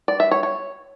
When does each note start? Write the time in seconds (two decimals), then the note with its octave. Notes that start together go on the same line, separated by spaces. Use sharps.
0.08 D5
0.20 E5
0.31 C#5
0.43 C#5